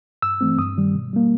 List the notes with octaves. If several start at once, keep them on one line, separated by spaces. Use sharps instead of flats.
G2 E6
E3 A3 C4
G2 D#6
D#3 G3
B2
G3 A#3